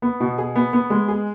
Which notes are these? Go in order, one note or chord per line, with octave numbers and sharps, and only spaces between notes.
B3
B2
G#4
B3
B3
G#3
G#4